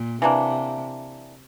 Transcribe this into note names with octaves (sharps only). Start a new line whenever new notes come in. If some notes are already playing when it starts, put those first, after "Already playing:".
Already playing: A#2
C3 E3 A#3 D4